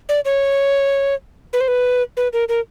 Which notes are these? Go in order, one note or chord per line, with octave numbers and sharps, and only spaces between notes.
D5
C#5
B4
C5
B4
B4
A#4
A#4